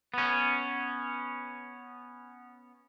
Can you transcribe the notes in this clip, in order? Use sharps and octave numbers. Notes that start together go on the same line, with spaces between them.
B3 C#4